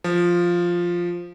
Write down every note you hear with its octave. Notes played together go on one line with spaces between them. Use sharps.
F3